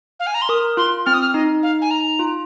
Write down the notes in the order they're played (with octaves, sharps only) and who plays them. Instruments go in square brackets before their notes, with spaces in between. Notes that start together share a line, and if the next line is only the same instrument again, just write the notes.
[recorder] F5
G#5
A#5
C6
[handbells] A#4 [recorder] D#6
[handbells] F4 [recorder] C6
[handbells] C4 [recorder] F6
[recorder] D#6
F6
[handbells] D#4 [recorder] D#5
[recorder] F5
G#5
A#5
[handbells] F4